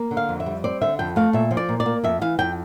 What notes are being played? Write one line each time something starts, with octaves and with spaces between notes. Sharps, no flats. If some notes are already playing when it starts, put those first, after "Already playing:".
Already playing: A#3
D3
F5
F2
E5
G3
C4 D5
D3 E5
F2 G5
A3 F5
A#2 E5
F3
D5
A#2
D5
A#3
F2 E5
E3 F5
F2 G5